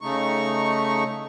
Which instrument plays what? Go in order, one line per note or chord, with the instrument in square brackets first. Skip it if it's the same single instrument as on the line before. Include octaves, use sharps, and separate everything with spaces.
[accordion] C#3 A3 D#4 C#6